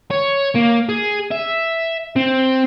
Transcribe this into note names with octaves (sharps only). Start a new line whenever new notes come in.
C#5
A#3
G#4
E5
C4